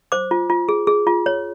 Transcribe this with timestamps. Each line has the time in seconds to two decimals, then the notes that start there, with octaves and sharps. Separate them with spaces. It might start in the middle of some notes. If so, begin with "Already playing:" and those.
0.12 C5 D6
0.31 F4
0.50 F4
0.69 G#4
0.87 G#4
1.07 F4
1.26 C#5